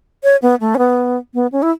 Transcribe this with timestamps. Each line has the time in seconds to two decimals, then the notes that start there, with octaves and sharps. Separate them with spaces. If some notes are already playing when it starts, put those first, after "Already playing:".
0.24 C#5
0.42 B3
0.60 A3
0.75 C#4
0.79 B3
1.34 B3
1.52 C#4
1.63 E4